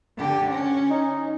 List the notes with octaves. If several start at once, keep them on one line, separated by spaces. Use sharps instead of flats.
D3 G4
C#4
D#4